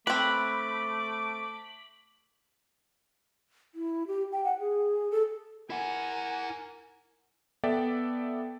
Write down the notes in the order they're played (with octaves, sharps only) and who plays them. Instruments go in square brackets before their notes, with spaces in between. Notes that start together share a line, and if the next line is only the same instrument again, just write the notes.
[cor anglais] A3 [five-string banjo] C4 B4 [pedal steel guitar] B5 [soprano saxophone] D6
[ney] E4
G4
G5
F#5
G#4
A4
[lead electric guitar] E4 F#5 [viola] A#4 G#5
[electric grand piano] B3 A4 D5 E5 G5